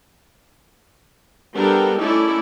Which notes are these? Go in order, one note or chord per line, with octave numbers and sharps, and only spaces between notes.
G3 B3 D4 A4 A#4 G5
A3 C#4 D#4 E4 A4 D5